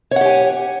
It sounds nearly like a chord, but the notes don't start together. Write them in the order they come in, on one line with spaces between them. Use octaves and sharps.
C#5 F#5 G4 G#5